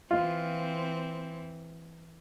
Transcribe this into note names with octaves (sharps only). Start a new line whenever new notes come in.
E3 C4 F4